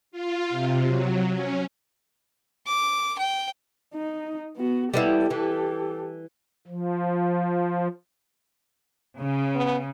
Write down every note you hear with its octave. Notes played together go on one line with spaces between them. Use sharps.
F4
C3
F#3
C#4
D6
G5
D#4
B3 F#4
G3 B3 E4 G4 A4
E3
F3
C#3
B3